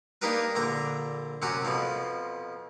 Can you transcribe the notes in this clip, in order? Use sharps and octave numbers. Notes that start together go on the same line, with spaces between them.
A#3 D4 D#4 G4 A#4 B4
A#1 D3 A#5 D6
F#2 C3 C#4 F#4 D6
F2 B2 F3